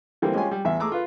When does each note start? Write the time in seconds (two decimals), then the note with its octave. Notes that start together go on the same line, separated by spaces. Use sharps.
0.22 D3 E3 G3 A#3 C4
0.34 G#3 C#4 F4 G4 G#5
0.51 G3
0.65 A1 E2 E5
0.80 A3 G#4 A#5 D6 E6
0.92 F4 B4